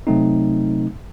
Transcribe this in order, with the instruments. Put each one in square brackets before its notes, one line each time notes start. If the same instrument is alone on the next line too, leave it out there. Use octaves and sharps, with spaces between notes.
[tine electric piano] C3 F#3 A3 C4 D#4